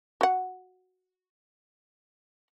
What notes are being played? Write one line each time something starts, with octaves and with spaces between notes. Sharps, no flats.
F#4 F#5